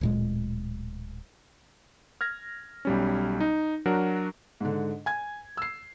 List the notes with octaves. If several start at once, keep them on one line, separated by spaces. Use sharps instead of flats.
D1 A#2 G#3
F6 G#6 A#6
B1 G3 C#4
D#4
F#3 D4 F#4 A#4
G#2 D3
G#5 G#6
E6 C7